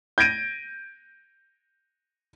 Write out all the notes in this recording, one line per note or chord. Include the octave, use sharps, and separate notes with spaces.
G6 G#6 A#6 D7 D#7